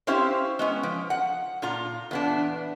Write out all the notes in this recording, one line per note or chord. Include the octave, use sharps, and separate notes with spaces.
C4 C#4 E4 G4 C5 F5
G#3 B3 C#4
F3
F#5
A#2 F4 A#5
E2 B3 D4